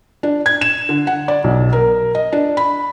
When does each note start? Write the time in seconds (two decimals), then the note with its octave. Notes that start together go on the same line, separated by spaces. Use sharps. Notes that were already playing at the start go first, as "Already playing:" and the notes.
0.23 D4
0.46 G#6
0.61 E7
0.89 D3
1.07 F#5
1.28 D5
1.44 B1
1.73 A#4
2.15 D#5
2.33 D4
2.57 B5